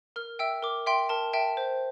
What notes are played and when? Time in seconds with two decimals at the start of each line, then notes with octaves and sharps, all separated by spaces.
0.16 A#4 F6
0.39 E5 G5 E6
0.63 A#4 D6
0.86 E5 G5 C6
1.09 A#4 A5
1.33 E5 G5 A5
1.57 C5